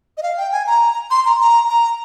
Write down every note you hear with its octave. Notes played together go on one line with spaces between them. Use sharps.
D#5
F5
G5
G#5
A#5
C6
A#5
A#5
A#5